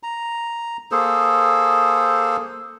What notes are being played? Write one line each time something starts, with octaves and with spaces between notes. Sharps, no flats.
A#5
A#3 G#4 A4 C5